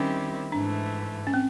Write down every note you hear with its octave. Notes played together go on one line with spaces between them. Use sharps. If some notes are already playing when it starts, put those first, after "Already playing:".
Already playing: D#3 G3 C4 C#4 E4 G4
G#2 E3 A3 D4
C#4
C4